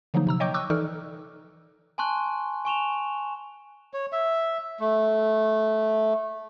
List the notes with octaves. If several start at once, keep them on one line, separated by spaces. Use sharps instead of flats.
D3 F3 F#3 A#3 D#4
C3 A#5 E6
C#5 D#5 G5 C#6 D6 G6
C#6 D6 E6 F#6
E3 D#4 A4 D5 F6
G#5 A5 C6 C#6 F#6
G#5 C#6 E7 F7
C#5
E5
A3